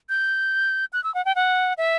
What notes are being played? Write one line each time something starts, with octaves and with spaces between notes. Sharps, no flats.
G6
F#6
E6
F#5
G5
F#5
E5